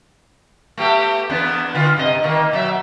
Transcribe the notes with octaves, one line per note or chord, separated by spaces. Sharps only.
A3 B3 G4
E2 B3 D4
D3 F4
G2 C3 D#5
A#2 D#3 A#3
B2 F#3 E5